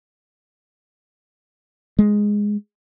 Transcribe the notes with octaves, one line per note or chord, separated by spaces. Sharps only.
G#3